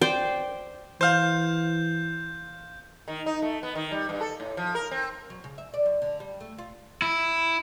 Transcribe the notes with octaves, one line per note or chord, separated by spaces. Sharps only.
C5 D5 G5
E3 C5 F5 G6
D#3
D#4
A3
B3
D#3
G3
G2
A4
A2
F3
A#4
C4
F#3
C#3
E5
D5
F#2
D3
G3
A3
F4
E4